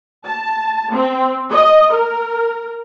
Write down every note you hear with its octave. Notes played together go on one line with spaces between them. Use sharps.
A5
C4
D#5
A#4